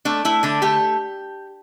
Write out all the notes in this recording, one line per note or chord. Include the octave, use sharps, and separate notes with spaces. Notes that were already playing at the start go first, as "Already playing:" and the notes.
A3 D4
A3 E4
D3 D4
A3 G4